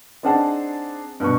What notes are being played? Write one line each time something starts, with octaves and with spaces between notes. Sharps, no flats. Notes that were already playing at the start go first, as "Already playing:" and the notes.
C4 D4 D#4 G#4 F#5 A5
G2 B2 B3 C#6